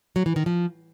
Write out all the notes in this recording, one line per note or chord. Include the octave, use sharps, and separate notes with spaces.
F#3
E3
D#3
F3